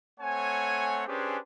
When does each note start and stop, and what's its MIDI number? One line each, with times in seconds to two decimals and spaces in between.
0.20 1.03 57
0.20 1.03 60
0.20 1.03 73
0.20 1.03 78
0.20 1.03 80
1.07 1.38 61
1.07 1.38 62
1.07 1.38 67
1.07 1.38 68
1.07 1.38 71
1.07 1.38 72